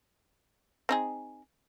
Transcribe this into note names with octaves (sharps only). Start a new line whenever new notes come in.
C4 D#4 G#4